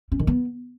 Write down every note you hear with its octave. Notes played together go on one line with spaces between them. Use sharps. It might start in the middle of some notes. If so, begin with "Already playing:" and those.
C#4
D#3
B3